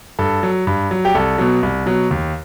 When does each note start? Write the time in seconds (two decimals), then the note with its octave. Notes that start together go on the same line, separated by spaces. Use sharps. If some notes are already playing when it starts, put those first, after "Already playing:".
0.19 G2 A4
0.43 F#3
0.67 G2
0.91 F#3
1.05 G4
1.15 C2 A4
1.38 B2 F#3
1.63 C2
1.86 B2 F#3
2.11 D#2